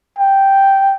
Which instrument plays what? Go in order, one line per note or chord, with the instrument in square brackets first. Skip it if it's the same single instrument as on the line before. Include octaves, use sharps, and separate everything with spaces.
[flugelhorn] G5